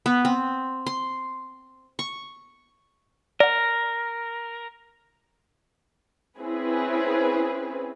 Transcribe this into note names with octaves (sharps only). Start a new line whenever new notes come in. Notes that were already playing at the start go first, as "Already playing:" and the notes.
B3
C4
C6
C#6
A#4 D5 F#5
C4 C#4 E4 G#4 B4